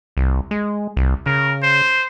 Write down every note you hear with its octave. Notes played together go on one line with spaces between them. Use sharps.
C2
G#3
C2
C#3 A#4
C5